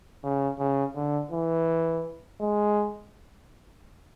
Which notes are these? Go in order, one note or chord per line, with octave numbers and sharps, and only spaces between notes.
C#3
C#3
D3
E3
G#3